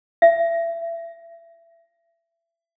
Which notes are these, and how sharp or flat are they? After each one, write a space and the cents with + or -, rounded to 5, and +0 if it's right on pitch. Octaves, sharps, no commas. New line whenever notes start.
E5 +25